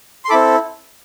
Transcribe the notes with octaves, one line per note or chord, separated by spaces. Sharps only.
C6
C4 E4 A4 B5 D6